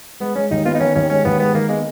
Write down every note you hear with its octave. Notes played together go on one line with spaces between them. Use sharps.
G#3 B3
G#3 C#4
D#2 D#4
B3 F4
D#4
D#3 C#4
D#2 C#4
G#3 C#4
D#2 B3
G#3 B3
D#3 A#3
G#3 B3